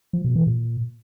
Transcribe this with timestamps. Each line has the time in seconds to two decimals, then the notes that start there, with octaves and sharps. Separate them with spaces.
0.13 F3
0.24 B2
0.36 E3
0.47 A#2